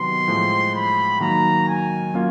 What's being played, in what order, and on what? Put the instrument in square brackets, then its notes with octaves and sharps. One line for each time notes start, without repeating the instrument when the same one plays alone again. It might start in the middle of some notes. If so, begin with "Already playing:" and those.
Already playing: [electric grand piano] C3 D#3 F#3 B3 [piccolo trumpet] C6
[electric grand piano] A2 F3 G#3
[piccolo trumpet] B5
[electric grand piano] D#3 F#3 A#3 [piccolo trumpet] A#5
[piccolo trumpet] G#5
[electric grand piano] F#3 A#3 C#4 F4